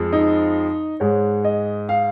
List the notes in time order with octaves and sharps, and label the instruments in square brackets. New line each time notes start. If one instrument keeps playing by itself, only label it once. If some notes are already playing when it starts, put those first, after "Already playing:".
Already playing: [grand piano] F2 F3 G#3
D#4
G#2 G#3 C#5
D#5
F5